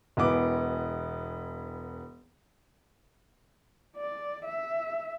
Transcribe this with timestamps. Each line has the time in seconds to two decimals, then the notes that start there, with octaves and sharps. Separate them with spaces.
0.17 E1 E3 B3 D6
3.97 D5
4.45 E5